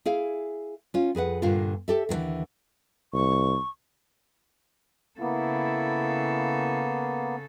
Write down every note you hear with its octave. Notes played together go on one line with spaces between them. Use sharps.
E4 G#4 F5
C#4 F4
F2 G#4 B4 F#5
G2 A#2 D3 A#3 F4
G4 A4 E5
D#2 A2 D3 E3
C2 C#6
C#3 A#3 B3 E4 A4